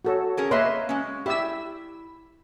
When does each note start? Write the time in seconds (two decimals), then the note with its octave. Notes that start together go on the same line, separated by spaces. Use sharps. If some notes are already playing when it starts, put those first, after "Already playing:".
0.05 F#4 A4 C#5
0.37 C#4 G#4 A#4
0.51 A#3 B4 C#5 D#5 E5 C6
0.89 G#3 C#4
1.26 E4 G4 E5 E6